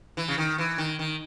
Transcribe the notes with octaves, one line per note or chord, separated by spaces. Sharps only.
E3
C#3
D#3
E3
D#3
D#3